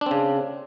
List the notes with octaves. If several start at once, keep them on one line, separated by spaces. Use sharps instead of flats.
C#3 C4 D4